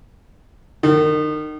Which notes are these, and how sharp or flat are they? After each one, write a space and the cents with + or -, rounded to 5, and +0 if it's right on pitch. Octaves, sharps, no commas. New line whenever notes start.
D#3 -25